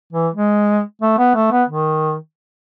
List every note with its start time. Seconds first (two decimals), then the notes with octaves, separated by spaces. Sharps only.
0.12 E3
0.34 G#3
1.02 A3
1.18 B3
1.35 A3
1.51 B3
1.68 D#3